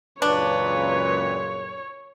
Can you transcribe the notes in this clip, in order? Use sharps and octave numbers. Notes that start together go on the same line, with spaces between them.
C#2 F#2 A#2 D4 B4 C#5